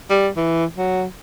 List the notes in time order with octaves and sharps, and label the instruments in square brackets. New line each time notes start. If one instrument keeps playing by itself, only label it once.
[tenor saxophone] G3
E3
F#3